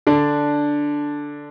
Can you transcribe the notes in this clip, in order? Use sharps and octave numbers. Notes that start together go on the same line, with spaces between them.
D3 D4